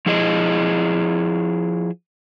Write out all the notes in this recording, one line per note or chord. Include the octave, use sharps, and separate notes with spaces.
F3 E4 G#4 D#5